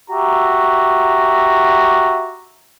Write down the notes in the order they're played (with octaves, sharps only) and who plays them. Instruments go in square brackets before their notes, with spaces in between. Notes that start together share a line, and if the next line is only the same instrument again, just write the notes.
[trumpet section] F#4 G4 E5 A#5